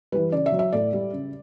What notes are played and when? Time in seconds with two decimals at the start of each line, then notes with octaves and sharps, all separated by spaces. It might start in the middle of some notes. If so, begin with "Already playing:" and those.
0.12 E3 G3 B4
0.32 C#3 D5
0.46 E5
0.52 F#3
0.59 E5
0.72 A2 D5
0.93 G3
1.13 C#3